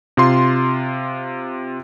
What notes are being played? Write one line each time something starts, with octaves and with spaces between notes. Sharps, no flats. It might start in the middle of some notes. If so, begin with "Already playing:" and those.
C3 F4 C6